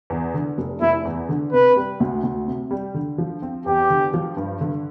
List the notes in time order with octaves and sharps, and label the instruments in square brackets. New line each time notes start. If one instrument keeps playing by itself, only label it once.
[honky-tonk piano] E2
D3
F1
[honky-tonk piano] F1 [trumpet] E4
[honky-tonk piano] E2
D3
[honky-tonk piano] C3 [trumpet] B4
[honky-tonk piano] G3
D2
D2
C3
G3
D3
F3
C4
[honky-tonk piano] E2 [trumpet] G4
[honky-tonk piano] D3
F3
G2
D3